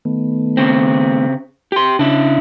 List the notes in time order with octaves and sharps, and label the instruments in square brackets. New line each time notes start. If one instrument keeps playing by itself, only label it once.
[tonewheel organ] D#3 A3 B3
[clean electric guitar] C#3 C4
[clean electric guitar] G4 C6 [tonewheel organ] G5
[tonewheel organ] C#3 C#4 [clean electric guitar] D4 E4